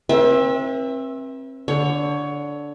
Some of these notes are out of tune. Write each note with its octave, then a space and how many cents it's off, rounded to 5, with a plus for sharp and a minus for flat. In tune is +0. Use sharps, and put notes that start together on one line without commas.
C4 +35 B4 -40 E5 +0
D3 -10 C#5 +15